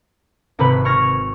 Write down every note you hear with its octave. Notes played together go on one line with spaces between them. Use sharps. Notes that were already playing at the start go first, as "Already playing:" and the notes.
G#1 C3 B4 B5 F#6
C#6 F6 G#6 A#6 C#7